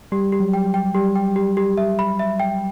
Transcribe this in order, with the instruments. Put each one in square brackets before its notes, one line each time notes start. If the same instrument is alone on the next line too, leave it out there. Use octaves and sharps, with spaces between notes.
[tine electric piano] G3 [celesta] G4
[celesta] G4
[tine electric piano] F#3
[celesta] G5
G5
[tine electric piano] G3 [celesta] G4
[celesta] G5
G4
G4
E5
B5
E5
G5